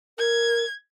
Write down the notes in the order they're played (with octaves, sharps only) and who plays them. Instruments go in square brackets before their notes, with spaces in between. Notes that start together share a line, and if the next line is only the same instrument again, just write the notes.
[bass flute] A#4 [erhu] G#6